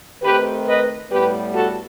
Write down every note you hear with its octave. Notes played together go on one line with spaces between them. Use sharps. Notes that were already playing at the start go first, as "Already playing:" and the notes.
D#3 A3 C4 G4 B4
B4 D#5
A2 G3 B3 G4 B4
F#4 A4